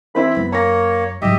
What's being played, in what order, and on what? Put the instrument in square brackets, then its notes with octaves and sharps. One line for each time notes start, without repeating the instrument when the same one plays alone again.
[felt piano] E3 C4 E4 [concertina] B5
[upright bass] F#2 [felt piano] B3
[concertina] A#3 C#5 [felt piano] A#5 A#6
[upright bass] G#2 F#3 [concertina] G4 D#5 E5